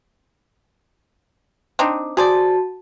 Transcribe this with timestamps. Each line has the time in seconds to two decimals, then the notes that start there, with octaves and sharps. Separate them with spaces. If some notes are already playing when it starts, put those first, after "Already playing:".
1.79 C4 D4 D#4
2.17 F#4 G#4 C5 D5 A5